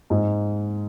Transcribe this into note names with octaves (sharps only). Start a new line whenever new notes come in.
G#2